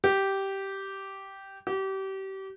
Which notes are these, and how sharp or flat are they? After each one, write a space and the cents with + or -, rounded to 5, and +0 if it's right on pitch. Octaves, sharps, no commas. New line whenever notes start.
G4 -10
G4 -30